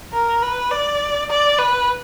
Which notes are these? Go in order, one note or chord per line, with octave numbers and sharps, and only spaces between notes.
A#4
B4
D5
D5
B4